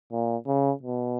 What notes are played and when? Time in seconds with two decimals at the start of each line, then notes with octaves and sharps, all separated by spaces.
0.12 A#2
0.47 C#3
0.83 B2